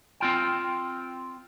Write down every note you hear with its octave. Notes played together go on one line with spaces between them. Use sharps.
C4 F4 G5